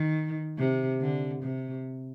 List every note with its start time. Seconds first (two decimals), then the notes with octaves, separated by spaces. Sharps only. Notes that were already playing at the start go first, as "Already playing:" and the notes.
Already playing: D#3
0.58 C3
1.01 D3
1.43 C3